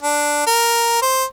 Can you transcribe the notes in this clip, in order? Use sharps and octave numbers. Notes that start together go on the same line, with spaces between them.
D4
A#4
C5